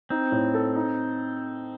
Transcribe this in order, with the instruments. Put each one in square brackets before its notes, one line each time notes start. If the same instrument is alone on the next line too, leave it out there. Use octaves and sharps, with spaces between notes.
[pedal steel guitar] C4 [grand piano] D#4
[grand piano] A2
A4
D#4